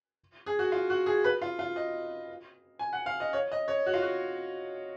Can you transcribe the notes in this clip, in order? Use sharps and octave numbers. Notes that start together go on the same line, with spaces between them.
G#4
F#4
F4
F#4
G#4
B4
F4
F4
D#5
G#5
F#5
F5
D#5
C#5
D#5
C#5
F#4
F4
F#4